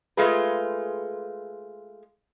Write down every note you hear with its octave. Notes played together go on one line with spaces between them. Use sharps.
G#3 A3 F4 G#4 B4